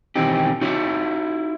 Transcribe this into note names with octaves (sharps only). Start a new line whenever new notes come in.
B1 D#3 E3 C4 D#4 G4
D#4 E4 F#4 C#5 E5